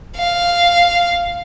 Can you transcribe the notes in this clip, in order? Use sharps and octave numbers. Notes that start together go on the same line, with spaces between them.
F5